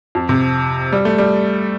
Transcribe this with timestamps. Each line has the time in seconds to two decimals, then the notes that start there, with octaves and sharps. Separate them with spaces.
0.15 F2
0.29 C3
0.92 G3
1.05 A3
1.18 G3